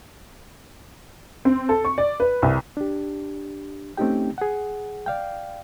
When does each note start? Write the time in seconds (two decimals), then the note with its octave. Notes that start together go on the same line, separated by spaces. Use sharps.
1.45 C4
1.69 A4
1.85 C#6
1.98 D5
2.20 B4
2.42 C2
2.77 D4 G4
3.97 A3 C4 C#4 D#4 G4 G5
4.38 G#4 F#5
5.06 D5 F5 G5